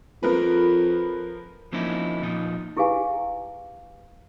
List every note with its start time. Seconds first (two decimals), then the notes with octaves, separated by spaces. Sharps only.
0.23 F2 F3 A#4 B4
1.72 F3 A#3 C4 C#4 D#4 E4
2.23 A#2 F3 D#4
2.77 E4 G4 G#4 B4 F5 G#5